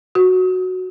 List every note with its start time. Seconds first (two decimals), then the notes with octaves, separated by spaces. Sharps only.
0.15 F#4